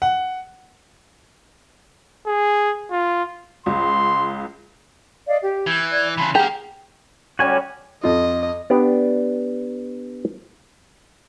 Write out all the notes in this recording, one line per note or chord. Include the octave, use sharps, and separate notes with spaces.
F#5
G#4
F4
C#2 C6
D5 D#5 F5
G4
E3 G6 G#6
D5 G#6
C#3 E3 A5 B5 C6
A#3 G4 G#4 F#5 A#5
D3 G3 C#4 F#4 G#5
F2 F4 D#5
B3 D4 G4 D5